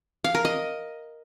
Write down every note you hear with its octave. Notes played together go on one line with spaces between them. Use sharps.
F5
A#4
D#5